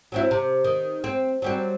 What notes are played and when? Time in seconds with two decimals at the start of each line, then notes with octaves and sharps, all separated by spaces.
0.12 F#3 C4 E4
0.31 C3
0.64 D#3
1.04 C4
1.42 F#3 G3 C4